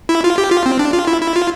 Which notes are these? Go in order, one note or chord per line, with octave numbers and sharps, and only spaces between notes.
E4
F4
G4
F4
C4
D4
F4
E4
E4
F4